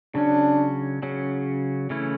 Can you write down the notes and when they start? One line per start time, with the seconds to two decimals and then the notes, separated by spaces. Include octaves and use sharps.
0.15 C#3 F#3 C#4 D4
1.03 C#3 F#3 C#4
1.90 C#3 E3 A3 C#4 E4